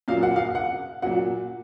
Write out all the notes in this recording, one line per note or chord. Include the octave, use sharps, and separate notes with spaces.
A#2 F#3 F5
F#5
F5
F#5
A#2 F#3 F#5